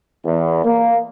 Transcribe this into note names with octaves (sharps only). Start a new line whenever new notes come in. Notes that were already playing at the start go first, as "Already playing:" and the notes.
E2
A#3